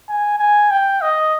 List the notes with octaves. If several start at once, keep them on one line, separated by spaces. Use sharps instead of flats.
G#5
G#5
G5
D#5